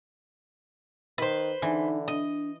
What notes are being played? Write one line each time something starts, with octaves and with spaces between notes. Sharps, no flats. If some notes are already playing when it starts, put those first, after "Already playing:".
D#3 B4 C5
D3 E3 D#4
D4 D#5